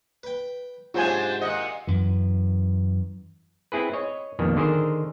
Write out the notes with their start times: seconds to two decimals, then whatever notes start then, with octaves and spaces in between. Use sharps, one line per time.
0.23 B4 G5
0.94 G#2 C3 F#3 D4 F4 C5 G#5
1.41 A#2 E3 D#5 F#5
1.87 F#2 E3
3.72 C4 E4 G#4 B4
3.93 C#5 D#5
4.39 A#1 F2 B2 D#3 G3
4.56 D3 D#3 G#4 A#4 C5